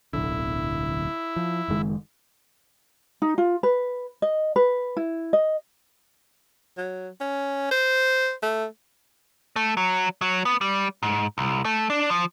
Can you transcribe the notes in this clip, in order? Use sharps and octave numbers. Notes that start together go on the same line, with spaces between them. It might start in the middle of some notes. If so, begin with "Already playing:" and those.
D1 B1 D3 E4
F3
F#1 D#3 G#3
D#4
F4
B4
D#5
B4
E4
D#5
F#3
C#4
C5
A3
A3
F#3
F#3
B3
G3
G#2
C2
A3
D4
F3